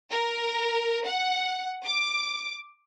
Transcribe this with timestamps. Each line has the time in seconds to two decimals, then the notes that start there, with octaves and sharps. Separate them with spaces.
0.11 A#4
1.06 F#5
1.85 D6